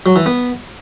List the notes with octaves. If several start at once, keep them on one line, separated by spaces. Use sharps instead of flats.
F#3
E3
B3